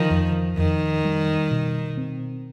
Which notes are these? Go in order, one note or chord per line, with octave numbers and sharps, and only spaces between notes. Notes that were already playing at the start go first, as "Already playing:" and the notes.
Already playing: D3 D#3 F3
F2
F2 D#3
G3
B2
C4